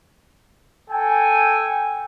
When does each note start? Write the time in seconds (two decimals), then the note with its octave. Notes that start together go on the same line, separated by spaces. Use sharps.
0.90 A4 G5 G#5